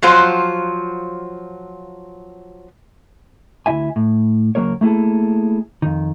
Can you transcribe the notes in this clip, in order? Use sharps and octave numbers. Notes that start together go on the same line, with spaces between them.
F3 F#3 F4 C5
D2 C3 E4 E5 G#5
A2
C#2 F#3 A#3 A#4 C#5
A3 A#3 E4 G#4 A4
F2 D#3